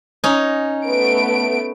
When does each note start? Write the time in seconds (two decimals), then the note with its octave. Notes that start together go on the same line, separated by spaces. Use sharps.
0.24 C#4 D#4
0.87 A3 B3 D7